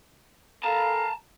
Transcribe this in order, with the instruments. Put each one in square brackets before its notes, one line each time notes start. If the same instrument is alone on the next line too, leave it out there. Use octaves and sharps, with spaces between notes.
[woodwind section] A4 A#4 F5 [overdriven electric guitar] A5 A#5